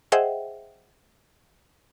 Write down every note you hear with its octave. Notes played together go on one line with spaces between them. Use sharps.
G#4 C5 D#5 E5 F#5 G5